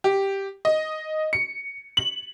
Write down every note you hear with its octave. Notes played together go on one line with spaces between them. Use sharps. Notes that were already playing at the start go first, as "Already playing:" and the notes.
G4
D#5
C#7
F#7